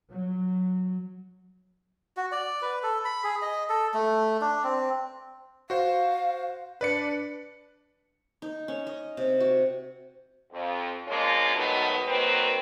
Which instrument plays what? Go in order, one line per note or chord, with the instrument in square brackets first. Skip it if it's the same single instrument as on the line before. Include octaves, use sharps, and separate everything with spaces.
[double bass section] F#3
[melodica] F#4
D5
B4
A4
B5
G#4
D#5
A4
A3
D4
C4
[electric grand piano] F#4 C5 [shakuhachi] F5
[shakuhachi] D4 [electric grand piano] B4 D5 C#7
[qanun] D#4
C#4
D#5
C3
F#4
[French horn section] F2
F3 G#3 A#3 C#4 D4 F4
G#2 B2 D#3 F#3 A3 B3
D#3 F#3 A#3 C4 A#4 B4